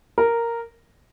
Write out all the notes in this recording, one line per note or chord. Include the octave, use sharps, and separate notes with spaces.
A#4